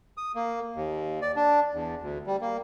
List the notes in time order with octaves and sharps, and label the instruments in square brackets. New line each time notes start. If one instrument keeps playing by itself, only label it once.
[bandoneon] D#6
A#3
D#2
D5
D4
E2
D2
G3
A#3